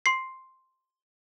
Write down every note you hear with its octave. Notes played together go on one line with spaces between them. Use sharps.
C6 C7